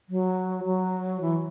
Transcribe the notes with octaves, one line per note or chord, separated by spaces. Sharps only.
F#3
F#3
E3